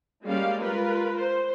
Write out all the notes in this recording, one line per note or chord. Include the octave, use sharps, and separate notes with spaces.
G3 G#3 A#3 C#4 D5 F5
F4 A#4 B4
C5